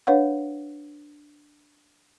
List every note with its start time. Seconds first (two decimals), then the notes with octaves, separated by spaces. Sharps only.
0.07 D4 B4 C#5 F5 F#5